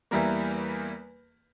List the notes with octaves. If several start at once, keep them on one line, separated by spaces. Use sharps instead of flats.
E2 E3 G3 A#3 A#4